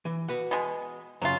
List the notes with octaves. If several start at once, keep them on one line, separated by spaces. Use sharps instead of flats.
E3
F#4 B4 F#5
B2 G#3
F#2 C#3 F#3 F4